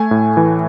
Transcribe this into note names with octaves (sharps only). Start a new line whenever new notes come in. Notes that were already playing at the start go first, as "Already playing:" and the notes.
Already playing: A3 G#5
A2
E3